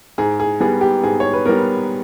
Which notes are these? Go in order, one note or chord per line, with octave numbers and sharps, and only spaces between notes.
G#2 G#4
G#4
G3 B3 G#4
G4
G#2 G#4
C#5
B4
G3 B3 A#4